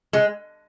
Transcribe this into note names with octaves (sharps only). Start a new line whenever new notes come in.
G#3